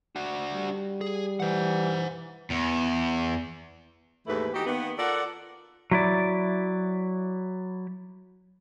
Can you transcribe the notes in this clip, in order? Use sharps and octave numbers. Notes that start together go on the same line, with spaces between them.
D4 F#4
G3
G#4
E3 C5 F#5
E2
D#2 G#2 E3 A3 E4 B4
E3 D#4 F#4 G4
D#3 A#3 B3
F4 A4 A#4 D5 F#5
F#3 E4 D5